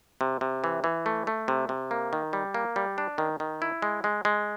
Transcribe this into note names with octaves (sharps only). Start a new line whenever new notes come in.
C3
C3
E3
E3
A3
A3
C3
C3
A#3
D#3
G3
A#3
G3
D4
D#3
D#3
E4
G#3
G#3
G#3